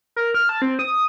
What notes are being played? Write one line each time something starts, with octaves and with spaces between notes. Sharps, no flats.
A#4
F6
A5
C4
D#6